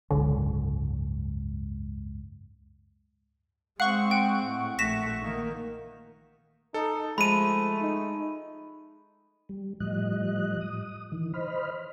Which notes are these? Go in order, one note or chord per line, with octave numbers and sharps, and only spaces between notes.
F#1 C#2 G#2 D3
G#3 C4 F5 F#5 C#6
G5
A2
A#1 A3 A#6 B6 E7
D#3 A#3
D#4 A4
F3 G#3 A3 B5 D#7
D#4
G3
A2 F3 G3 D#5 F#6
D#6
D#3 E3
C5 D#5 B5 F6